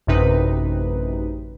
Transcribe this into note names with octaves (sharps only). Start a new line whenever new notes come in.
A1 F#2 C3 D#4 B4